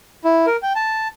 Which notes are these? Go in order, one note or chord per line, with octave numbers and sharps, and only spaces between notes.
E4
A#4
G5
A5